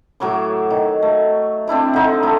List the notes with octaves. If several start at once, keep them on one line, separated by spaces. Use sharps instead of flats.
A2 F#3 C#5 D6
D#3
A3
C4 D4 E4 D5
D3 D#4
A3 E4